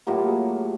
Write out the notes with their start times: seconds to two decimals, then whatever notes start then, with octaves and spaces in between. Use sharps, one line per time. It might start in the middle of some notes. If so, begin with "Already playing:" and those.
0.07 A2 F#3 A#3 F4 G4
0.17 F4 G4
0.27 F#4 G#4